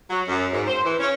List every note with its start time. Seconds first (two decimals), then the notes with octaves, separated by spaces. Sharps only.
0.10 F#3
0.28 F#2
0.53 G#2
0.67 C5
0.84 E3
0.99 C#4